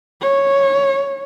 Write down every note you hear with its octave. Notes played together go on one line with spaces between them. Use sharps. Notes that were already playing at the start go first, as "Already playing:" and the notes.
C#5